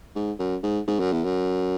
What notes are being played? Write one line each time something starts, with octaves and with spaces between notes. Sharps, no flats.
G#2
F#2
G#2
G#2
F#2
E2
F#2